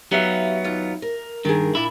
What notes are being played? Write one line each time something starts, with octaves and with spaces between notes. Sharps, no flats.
F#3 B3 D#4 G4 E5 F5
D#2 F4
A#4
G2 D#3 G#4 A#4
A#2 D4 E4